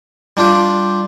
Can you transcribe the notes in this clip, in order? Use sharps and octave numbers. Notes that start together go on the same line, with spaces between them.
G3 D4 F4 G4